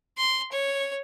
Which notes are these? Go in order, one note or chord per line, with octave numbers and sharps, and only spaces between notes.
C6
C#5